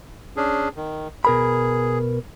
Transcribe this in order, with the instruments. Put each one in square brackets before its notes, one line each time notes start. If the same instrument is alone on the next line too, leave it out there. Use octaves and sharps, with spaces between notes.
[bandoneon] C#4 D4 G#4
D#3
[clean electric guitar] B2 A#4 B5 [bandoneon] G#4